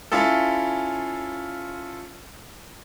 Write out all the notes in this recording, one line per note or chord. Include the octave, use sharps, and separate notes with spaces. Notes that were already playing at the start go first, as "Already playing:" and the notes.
C#4 E4 F4 A4